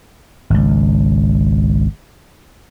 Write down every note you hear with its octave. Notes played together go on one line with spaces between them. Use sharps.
G#1 C#2